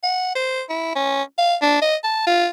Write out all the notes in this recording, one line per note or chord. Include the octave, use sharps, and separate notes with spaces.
F#5
C5
E4
C#4
F5
D4
D#5
A5
F4